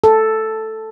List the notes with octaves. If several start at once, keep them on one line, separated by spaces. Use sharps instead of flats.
A4